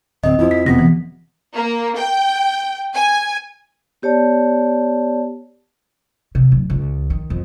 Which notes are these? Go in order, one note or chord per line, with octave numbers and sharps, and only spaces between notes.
D1 C4 D#5
F2 F3 E4
B6
E1 F2 C3 B3 A#6
E3
A#3
G5
G#5
B3 G4 C#5 D5 A5
C3
D1
C#2
D#3
F2